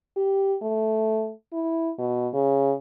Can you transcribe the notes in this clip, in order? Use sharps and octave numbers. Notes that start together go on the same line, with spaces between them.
G4
A3
E4
B2
C#3